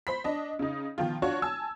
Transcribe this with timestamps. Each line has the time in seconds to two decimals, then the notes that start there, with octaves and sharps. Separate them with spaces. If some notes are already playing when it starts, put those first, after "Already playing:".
0.07 C5 B5 B6
0.24 D4 D#5
0.59 C#3 D#4
0.98 B2 D#3 F3 F4
1.22 D4 F4 F#4 C#5
1.42 G#5 A5 E6 G#6